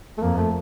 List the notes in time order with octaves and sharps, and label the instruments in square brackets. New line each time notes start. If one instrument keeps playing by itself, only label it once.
[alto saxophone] A3
[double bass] F2 [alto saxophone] A#3
[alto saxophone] A3